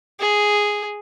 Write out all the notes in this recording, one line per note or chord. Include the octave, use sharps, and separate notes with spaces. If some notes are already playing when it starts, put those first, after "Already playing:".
G#4